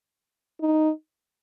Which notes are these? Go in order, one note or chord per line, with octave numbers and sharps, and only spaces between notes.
D#4